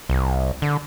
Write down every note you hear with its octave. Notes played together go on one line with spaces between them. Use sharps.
C2
D3